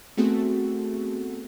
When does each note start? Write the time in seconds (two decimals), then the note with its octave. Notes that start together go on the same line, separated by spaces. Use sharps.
0.17 A3 B3 C4 F#4 G#4 A4